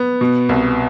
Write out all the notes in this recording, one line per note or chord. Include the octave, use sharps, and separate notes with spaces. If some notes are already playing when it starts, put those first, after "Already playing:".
Already playing: B3
B2
C2